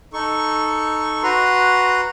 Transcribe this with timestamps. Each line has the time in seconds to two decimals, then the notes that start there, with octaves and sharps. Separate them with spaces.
0.13 D#4 A4 C#6
1.23 F#4 B4 A#5 C6